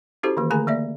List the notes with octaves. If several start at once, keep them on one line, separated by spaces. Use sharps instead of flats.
C#4 E4 F#4 G4 A4 C5
D#3 E3 A#3
D3 A3 G#4 G#5 A#5
A#3 D5 E5